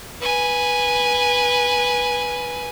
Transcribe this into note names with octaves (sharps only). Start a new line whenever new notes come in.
B4 G#5